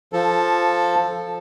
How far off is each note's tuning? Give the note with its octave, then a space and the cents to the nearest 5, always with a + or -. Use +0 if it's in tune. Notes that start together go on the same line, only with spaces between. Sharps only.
F3 +0 A4 +0